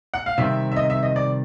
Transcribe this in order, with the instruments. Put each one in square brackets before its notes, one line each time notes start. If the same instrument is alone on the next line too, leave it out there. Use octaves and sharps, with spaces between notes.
[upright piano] F#5
F5
[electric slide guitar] C3 D#3 G3 C4 [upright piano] E5
[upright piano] E5
D#5
E5
D#5
D5